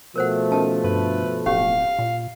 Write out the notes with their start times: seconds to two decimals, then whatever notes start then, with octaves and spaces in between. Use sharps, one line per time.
0.16 B2 F3 A3 A#4 C5 F#5
0.52 D#3 C#4 A5
0.84 G2 B4
1.46 D1 C#4 G4 F5
1.99 A#2